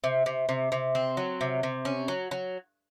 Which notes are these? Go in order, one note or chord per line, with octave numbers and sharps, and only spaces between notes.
C3
C3
C3
C3
C4
F#3
C3
C3
C#4
F#3
F#3